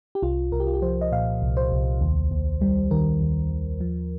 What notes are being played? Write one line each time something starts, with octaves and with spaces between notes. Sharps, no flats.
G4
C2 F4
C2 A#4
G4
F4
G4
F3 C5
D#5
A#2 F5
C2
C5
C2
D#2
D#2
G3
D#3 A#4
D#2
D#2
F3